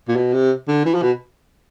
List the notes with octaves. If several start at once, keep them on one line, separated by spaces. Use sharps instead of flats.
A#2
B2
C3
D3
E3
F3
B2